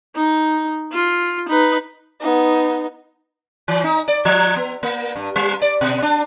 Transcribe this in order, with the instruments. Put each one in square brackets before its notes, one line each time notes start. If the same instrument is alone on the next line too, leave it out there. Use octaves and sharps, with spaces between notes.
[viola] D#4
F4
D#4 B4
[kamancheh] B3 D#4
[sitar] E3
D#4
D5
F3
B3
A#3
G2
G3
D5
B2
D4